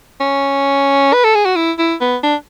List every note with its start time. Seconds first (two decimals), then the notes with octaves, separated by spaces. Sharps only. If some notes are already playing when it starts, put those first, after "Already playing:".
0.20 C#4
1.13 B4
1.24 A4
1.35 G#4
1.45 F#4
1.56 E4
1.79 E4
2.01 B3
2.23 D4